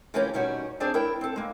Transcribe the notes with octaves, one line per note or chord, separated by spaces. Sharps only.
C#3 E3 F3 A#3 C#4 G4
B2 D#3 G3 C#4 F#4
C4 D4 G#4 C5 D5
E4 A#4 G5
C4 A4
G#3 A#3